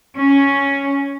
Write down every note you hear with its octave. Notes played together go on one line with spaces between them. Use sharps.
C#4